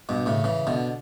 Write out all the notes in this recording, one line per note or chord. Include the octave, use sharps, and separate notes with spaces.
G2 B2
A2 C#3
C#3 E3
B2 D3